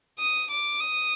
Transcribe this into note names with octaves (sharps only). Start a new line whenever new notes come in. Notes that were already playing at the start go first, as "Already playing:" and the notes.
D#6
D6
D#6